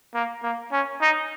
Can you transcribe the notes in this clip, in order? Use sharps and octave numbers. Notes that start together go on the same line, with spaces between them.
A#3
A#3
C#4
D#4